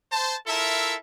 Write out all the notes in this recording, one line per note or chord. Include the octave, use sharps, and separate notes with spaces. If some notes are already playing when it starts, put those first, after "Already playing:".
C5 A5
E4 F4 A4 A#4 E5